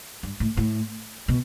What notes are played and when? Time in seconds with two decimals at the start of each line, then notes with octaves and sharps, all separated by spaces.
0.23 G2
0.40 A2
0.57 A2
1.28 B2